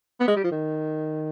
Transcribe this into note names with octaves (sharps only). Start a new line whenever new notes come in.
B3
G#3
G3
F3
D#3